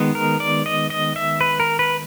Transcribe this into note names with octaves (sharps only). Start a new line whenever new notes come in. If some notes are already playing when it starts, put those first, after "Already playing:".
Already playing: D#3 G#3 B3
A#4
D5
D#5
D#5
E5
B4
A#4
B4